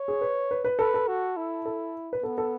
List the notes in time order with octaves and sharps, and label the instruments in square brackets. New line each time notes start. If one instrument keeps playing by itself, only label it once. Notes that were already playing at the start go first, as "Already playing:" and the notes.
Already playing: [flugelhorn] C#5
[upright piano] G#4
B4
B4
B4
[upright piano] A4 [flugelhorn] B4
[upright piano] A4
[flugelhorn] F#4
E4
[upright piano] A4
B4
[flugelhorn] B3 [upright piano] A4
[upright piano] A4